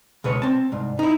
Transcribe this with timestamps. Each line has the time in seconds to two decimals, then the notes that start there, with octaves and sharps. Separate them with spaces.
0.24 C#2 B2 B4 C#5
0.42 C4 A5
0.72 C2 G#2
0.99 D#4 E4